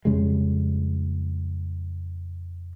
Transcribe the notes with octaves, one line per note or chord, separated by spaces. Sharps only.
F2 C#3 G3 G#3